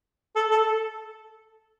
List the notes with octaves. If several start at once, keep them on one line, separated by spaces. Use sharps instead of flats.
A4
A4